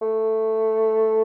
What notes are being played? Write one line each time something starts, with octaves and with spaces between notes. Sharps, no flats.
A3